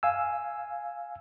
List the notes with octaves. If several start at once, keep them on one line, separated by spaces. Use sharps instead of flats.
F5 G#5 E6